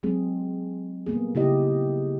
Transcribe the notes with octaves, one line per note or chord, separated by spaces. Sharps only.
F#3 G#3 C4 G#4
G3 A#3 B3 G#4
C#3 E4 G4 D#5